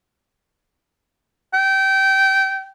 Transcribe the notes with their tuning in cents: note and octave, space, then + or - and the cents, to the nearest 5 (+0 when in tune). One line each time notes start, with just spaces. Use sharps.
G5 -20